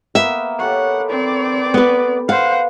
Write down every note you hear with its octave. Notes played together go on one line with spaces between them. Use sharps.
A#3 B3 E5
G4 A4 C#5 F#5
C4 D5
B3 B4
C5 F5 F#5